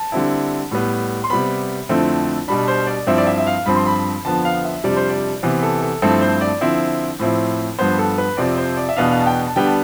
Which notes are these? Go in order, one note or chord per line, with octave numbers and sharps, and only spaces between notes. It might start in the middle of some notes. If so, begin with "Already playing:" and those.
Already playing: A5
D3 G3 C4 E4
A2 G3 B3
C6
C3 G3 B3 B5
F2 D3 A3 C4 E4
B2 G3 D4 B5
C5
D5
G2 F3 C4 E4 E5
D5
E5
E5
F5
G2 F3 C4 B5
C6
B5
F2 D3 F3 B3 A5
F5
E5
F2 C3 G3 D4 D5
C5
D5
C3 E3 B3
A4
A4
G2 F3 A3 C4 E4 A4
C5
D5
D3 F3 C4 E4
A2 F3 C4 E4
G2 F3 B3 C5
A4
B4
F2 C3 F3 C4 D5
C5
D5
E5
E2 B2 B3 D4 F5
F5
A5
G5
A5
D3 G3 B3 D4 G5
A5